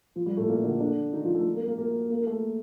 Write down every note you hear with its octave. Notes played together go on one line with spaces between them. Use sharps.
F3
G3
A2 A3
A#2 A#3
D3 D4
D3 D4
D#3 D#4
F3 F4
A3 A4
A#3 A#4
A#3 A#4
A#3 A#4
A#3 A#4
A#4
A3 A4